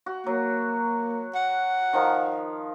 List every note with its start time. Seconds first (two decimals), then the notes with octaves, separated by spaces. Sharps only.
0.06 F#4
0.26 F#3 A#3
1.35 F#5
1.93 D#3 F3 A#4